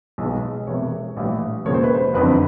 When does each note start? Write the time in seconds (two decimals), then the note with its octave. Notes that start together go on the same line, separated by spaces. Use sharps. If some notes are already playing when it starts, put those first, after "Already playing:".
0.18 B1 B2 G#3
0.67 E1 E2 C3 E3 C#5
1.17 A#1 A2 E3 G3
1.65 E1 D#2 C#3 F3 A#3 C#5
1.74 C5
1.84 B4
1.94 C5
2.14 F#1 F2 D3 B4